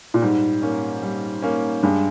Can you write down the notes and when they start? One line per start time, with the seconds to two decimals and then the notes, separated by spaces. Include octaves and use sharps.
0.14 A#2
0.22 G#2 G3
0.62 A#3 C#4
1.02 G3
1.42 A#3 C#4
1.83 G2 G#3